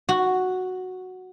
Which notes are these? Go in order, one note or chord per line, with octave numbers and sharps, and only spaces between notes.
F#4